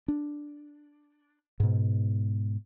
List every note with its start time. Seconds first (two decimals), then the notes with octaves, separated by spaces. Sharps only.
0.08 D4
1.60 G#2 B2